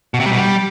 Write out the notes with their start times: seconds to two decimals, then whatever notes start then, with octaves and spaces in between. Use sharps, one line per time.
0.14 B2
0.20 C3
0.26 G3
0.32 B2
0.38 G3